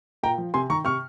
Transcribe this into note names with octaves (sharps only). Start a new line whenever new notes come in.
A#2 G5 A#5
F3
C3 G#5 C6
D#3 A#5 C#6
C3 C#6 F6